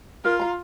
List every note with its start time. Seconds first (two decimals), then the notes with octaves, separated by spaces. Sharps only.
0.24 F4 A#4
0.40 F5 A#5